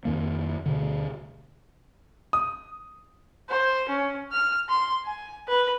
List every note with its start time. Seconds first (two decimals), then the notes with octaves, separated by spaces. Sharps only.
0.05 F2 D#3 A#3
0.66 D2 B2 D3
2.33 D#6
3.49 C5
3.89 C#4
4.32 F6
4.70 C6
5.05 G#5
5.48 B4